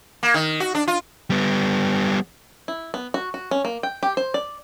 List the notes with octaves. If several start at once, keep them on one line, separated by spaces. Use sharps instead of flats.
A#3
D#3
F#4
D4
F4
G3 B3
E4
B3
F#4
F#4
C#4
A#3
G5
G4
C5
D5